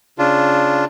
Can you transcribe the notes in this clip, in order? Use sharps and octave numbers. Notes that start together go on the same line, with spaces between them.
C#3 D4 F4